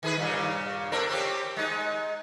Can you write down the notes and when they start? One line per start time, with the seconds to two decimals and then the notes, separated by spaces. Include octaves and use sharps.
0.03 D#3 G#4 B4
0.17 G2 A#2 C#3
0.92 C4 D4 A#4
1.10 C4 C#4 G4
1.57 G#3 D#4